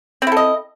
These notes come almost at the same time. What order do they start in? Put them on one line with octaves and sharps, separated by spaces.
C4 E4 A4 D#5